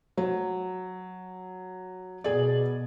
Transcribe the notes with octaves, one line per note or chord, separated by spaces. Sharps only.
F#3
B2 G#4 D5